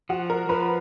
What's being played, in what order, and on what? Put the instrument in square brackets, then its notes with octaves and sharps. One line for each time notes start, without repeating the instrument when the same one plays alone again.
[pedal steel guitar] F3 [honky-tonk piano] F#4 F#5
[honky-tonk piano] A#4 A#5
[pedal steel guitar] F3 [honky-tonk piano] B4 B5